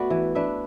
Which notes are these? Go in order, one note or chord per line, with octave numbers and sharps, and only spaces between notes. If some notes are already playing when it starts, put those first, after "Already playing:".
Already playing: A3 B3 F#4 B4 D5
E3
D4 B4 E5